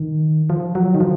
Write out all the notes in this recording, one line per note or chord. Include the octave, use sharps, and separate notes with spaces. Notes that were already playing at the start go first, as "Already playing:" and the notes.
Already playing: D#3
F3
F#3
D#3
F3